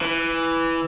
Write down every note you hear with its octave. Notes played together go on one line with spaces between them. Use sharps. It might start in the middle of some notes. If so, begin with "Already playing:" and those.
E3